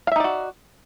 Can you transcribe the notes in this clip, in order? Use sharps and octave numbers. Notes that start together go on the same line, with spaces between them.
D#4 F#4 D5 E5 F5